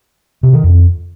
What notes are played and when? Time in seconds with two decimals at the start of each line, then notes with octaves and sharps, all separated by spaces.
0.43 C3
0.53 D#3
0.64 F2